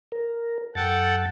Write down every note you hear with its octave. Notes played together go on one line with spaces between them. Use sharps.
A#4
F#2 A4 F#5 G5 A6